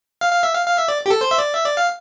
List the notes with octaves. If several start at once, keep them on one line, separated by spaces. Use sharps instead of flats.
F5
F5
E5
F5
F5
E5
D5
G4
A4
C5
E5
D5
E5
D5
F5